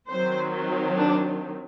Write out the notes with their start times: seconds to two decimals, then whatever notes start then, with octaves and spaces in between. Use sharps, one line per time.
0.10 D#3 F#3 C4 C5
0.99 D4